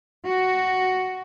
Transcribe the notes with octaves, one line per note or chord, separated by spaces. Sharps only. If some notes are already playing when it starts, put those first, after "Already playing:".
F#4